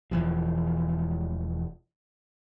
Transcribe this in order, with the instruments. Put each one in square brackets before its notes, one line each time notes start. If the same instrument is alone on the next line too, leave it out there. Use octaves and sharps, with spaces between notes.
[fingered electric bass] E1 E3 F3